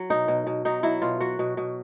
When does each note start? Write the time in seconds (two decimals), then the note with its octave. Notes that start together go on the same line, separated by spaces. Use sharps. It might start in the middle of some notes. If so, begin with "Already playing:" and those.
Already playing: F#3
0.10 B2 D#4
0.28 B2
0.47 B2
0.65 F#3 D#4
0.83 F#3 E4
1.02 B2 F4
1.20 F#3 F#4
1.39 B2
1.57 B2